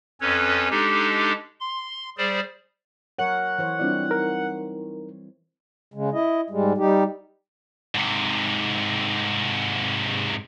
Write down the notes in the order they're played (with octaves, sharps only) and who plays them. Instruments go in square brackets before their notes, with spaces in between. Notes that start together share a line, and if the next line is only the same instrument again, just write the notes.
[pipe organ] F2 C#4 A4 B4 C#5
G#3 D4 D#4 G4 A4
C6
G3 G#4 C5 D5
[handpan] F#3 A#4 C#5 [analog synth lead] F#5
[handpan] E3 C5 C#5
[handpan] G3 C4 E4 [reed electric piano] D4 F4 D5
[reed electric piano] D#4 A#4
[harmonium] C#3 G#3
E4 D#5
G#2 G3 G#3
G3 D#4 G4
[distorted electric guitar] G#2 C3